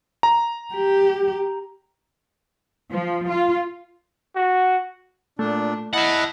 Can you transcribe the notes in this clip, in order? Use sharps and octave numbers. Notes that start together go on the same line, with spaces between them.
A#5
G4
F3
F4
F#4
A#2 A3 D4
E4 D#5 E5 F#5 A5